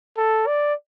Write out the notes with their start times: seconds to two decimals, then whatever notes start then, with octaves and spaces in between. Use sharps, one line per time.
0.18 A4
0.47 D5